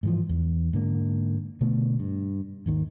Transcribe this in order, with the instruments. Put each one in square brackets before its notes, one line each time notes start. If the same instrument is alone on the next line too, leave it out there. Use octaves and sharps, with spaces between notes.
[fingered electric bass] G#2 E3 F3
E2
G#2 D3 A#3
B2 D3 A3 B3
G2
G#1 D#2 D#3